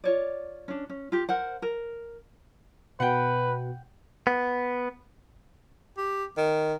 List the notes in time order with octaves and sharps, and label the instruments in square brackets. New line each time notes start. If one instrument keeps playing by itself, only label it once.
[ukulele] F4 C#5 D5
C#4 D4
C#4
F4 G4
A#4 C5 F#5
A#4
[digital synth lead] B2 [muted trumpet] B4 [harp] F#5 G5
[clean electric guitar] B3
[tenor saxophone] G4
D#3